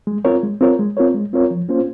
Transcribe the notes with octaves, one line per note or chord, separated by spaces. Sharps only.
G#3
C4 F4 A#4 C#5
G#3
C4 F4 A#4 C#5
G#3
C4 F4 A#4 C#5
G#3
C4 F4 A#4 C#5
F3
A#3 C#4 F4 C5